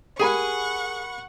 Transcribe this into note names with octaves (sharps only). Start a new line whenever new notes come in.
G4 G#4 A#4 F#5 G#5 B5 C#6